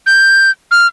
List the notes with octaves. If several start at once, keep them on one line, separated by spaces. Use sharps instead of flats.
G6
F6